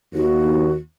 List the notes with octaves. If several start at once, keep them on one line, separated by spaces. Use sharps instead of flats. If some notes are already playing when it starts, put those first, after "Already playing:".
D#2 F#4